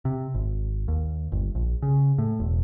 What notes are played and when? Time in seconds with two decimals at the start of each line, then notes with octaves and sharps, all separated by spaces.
0.05 C3
0.34 G#1
0.88 D#2
1.32 G1
1.55 A#1
1.82 C#3
2.18 A2
2.40 E1